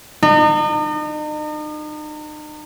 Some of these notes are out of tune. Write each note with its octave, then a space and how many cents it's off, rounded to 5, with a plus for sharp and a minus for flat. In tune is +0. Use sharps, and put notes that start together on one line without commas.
D#4 -40